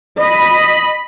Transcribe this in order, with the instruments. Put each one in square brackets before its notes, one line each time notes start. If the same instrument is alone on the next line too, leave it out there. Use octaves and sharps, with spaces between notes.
[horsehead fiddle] D#5 [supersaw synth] B5